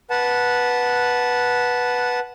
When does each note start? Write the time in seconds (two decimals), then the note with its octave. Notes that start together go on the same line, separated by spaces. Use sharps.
0.10 B4 F#5 A5